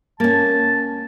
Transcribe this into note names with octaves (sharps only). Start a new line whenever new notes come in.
A#3 C#4 A5